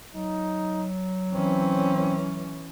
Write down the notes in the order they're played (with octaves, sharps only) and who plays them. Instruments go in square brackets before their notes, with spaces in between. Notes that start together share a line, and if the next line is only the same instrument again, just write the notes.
[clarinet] F#3 [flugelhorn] D#4
[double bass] E3 C#4 [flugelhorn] C4